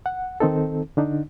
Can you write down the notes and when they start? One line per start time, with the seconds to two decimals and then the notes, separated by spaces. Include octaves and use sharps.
0.06 F#5
0.40 D#3 C4 D#4 A4
0.97 D3 D4 D#4